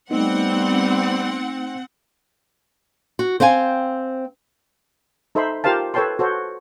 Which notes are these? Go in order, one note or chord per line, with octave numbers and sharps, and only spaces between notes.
G3 A3 B3 C4 D#4 F#5
F#4
C4 C5 F5 G5 G#5
D#4 A4 C5 E5 B5 C6
F4 G4 A#4 C5 F5 A5
A4 B4 C#5 G5 A5 C6
F#4 A4 C5 C#5